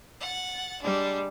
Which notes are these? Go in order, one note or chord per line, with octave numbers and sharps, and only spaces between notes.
F#5 A6
G3 G#3 D4